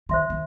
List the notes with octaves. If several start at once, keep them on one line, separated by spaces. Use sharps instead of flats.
D#3 C5 E5 C6
D#3